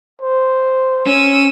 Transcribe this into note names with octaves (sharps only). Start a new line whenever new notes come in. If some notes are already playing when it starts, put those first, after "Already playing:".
C5
C#4 E6 D#7